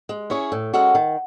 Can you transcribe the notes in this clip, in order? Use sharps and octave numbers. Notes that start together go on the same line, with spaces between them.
G#3
C#4 E4 G#4 C#5
A2
G#3 C#4 F#4 A4
D#3